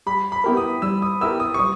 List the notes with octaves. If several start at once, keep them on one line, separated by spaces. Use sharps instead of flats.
G3 B5
B5
B3 E4 G4 A#4
D#6
G3 E6
D#6
B3 E4 G4 A#4 E6
D#6
C#6
G3 D#6